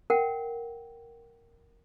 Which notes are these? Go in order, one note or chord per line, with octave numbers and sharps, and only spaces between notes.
A#4 F#5 G5